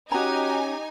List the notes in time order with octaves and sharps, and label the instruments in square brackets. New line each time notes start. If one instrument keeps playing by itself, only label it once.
[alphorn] C#4 [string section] D#4 G#5 [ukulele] F#4 A#5 [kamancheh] G4